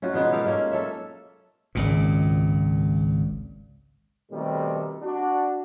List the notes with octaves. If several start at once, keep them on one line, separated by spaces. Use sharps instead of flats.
C#4 D#4 F4 F#4
B2 G#3 B3 D#4
G4 A4 A#4 F5
G#3 A#3 C#4
A4 C#5 E5
G#1 C#2 A#2
B2 D#3 G3 A3 C4
D4 F#4